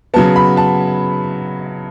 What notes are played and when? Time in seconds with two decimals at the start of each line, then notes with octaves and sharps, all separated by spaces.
0.14 C#3 F#3 B3 A5
0.36 B5
0.57 A5